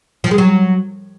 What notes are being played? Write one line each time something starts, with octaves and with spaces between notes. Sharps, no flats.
F3
G#3
F#3